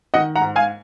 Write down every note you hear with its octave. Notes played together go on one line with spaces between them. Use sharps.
D#3 D#5 F#5
F#5 A#5
G#2
F5 G#5